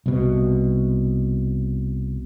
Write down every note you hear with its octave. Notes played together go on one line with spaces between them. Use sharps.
C2 B2